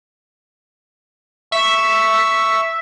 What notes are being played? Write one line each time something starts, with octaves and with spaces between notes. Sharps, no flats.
E5 C#6 E6